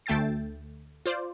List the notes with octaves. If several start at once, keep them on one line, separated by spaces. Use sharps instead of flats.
D2 A3 G5 E6 A6 C7
F4 C5 D5